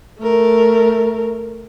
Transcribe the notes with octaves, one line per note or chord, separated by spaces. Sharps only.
A3 A#4